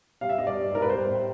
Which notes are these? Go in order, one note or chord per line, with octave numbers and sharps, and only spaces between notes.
G3 F5
E5
G2 D#5
D5
G3
G#2 A#4
B4
G3 C5
A2